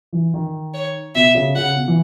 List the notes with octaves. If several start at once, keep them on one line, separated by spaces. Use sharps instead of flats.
E3
D#3
C#5
B2 E5
C#3
C#3 F#5
B2
E3